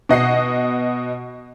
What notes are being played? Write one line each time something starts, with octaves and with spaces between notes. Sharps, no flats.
B2 D#5 F#5 C7